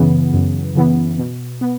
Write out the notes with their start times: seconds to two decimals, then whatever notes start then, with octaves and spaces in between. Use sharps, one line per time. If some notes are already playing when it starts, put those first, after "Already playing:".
Already playing: F#2 C#3 E3 B3
0.34 F#2
0.75 C#3 E3 B3
1.18 B2
1.61 B3